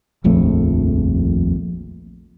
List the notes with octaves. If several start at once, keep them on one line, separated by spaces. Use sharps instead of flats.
D#1 A#1 F2 A3